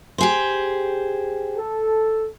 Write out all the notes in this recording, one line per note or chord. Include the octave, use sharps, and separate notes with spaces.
G4 G#4 C5
A4